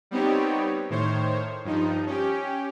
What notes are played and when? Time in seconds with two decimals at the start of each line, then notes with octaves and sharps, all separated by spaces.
0.11 G3 B3 C4 D#4 G4 C#5
0.90 A2 D#3 C5 C#5
1.64 G2 F3 D#4
2.07 C#4 G4